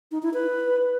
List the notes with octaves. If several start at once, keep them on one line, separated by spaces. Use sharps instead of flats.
D#4
E4
B4